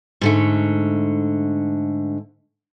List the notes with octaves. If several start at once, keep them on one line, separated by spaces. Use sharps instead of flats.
G#2 D3 A3